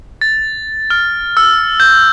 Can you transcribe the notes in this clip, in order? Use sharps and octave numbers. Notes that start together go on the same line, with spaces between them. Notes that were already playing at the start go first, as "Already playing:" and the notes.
A6
F6
E6
G6